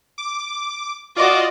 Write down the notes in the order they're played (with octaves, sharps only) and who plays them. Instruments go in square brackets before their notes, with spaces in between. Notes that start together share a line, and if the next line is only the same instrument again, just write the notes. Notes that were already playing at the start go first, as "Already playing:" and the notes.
[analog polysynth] D6
[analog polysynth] F4 D5 D#5 [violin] F#4 D6